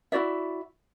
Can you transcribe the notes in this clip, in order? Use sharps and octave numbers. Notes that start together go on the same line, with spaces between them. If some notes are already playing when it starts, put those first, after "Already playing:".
E4 F#4 D5 E5